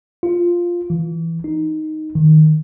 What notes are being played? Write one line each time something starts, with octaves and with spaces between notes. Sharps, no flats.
F4
E3
D#4
D#3